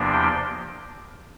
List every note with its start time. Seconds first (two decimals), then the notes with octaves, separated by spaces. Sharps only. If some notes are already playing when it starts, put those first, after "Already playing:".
Already playing: E2 C3 F3 A#3 D4
0.13 G5